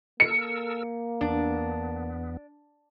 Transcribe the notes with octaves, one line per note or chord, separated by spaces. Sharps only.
A#3 A4 A#4 E6 C#7
E2 B3 D4